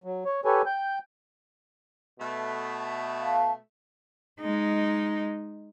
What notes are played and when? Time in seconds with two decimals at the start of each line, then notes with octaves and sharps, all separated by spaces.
0.04 F#3
0.25 C#5
0.45 G4 A4 B4 C#5 G#5
0.66 G5 G6
2.19 B2 A3
3.21 F5 A5
4.41 G#3 D#4